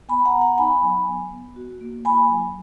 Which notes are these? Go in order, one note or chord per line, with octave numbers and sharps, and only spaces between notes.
B3 G#5 B5
F#5 A#5
B3
F#5 A#5
D#4 G#5 B5
F#3
B3
B3
F#4
A#3
E4 G#5 B5
F#3